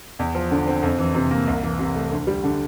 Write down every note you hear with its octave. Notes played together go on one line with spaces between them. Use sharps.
E2
F3
D3
C4
F2
E3
C3
A#3
C2
E3
C3
A3
D2
G3
D3